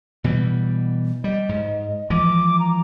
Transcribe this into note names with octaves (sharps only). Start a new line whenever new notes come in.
B2 E3 G3
G3 D#5
G#2
E3 F3 G#3 D6
A#5